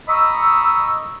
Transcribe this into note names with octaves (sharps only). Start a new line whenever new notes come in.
D#5 A#5 B5 C#6 D#6 E6